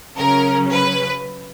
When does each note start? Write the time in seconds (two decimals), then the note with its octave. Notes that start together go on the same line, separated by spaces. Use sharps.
0.17 C#3 F#3 C#4 A#4
0.71 B4